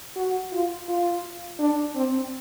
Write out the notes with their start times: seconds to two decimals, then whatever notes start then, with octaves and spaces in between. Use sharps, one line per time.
0.16 F#4
0.53 F4
0.88 F4
1.59 D4
1.95 C4